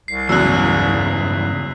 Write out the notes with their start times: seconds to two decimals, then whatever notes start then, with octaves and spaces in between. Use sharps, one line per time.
0.08 C2 C7
0.29 E2 G2 C#3 E3 F#3 E6 F#6